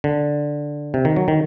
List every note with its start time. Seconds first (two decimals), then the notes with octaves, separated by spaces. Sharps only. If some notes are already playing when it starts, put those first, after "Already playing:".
0.04 D3
0.94 C3
1.05 D#3
1.16 F#3
1.28 D#3